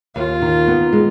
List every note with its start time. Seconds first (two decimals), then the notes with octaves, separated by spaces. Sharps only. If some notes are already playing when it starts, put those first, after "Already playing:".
0.15 D#2 F4
0.42 D#3
0.68 B3
0.93 G#3